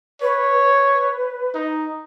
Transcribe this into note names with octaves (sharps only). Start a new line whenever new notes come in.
B4 C#5
B4
D#4